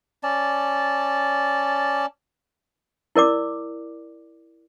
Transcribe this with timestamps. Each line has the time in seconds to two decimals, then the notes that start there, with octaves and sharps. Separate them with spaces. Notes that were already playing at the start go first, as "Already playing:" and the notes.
0.23 C#4 D5 A5
3.16 E4 A#4 D5 D6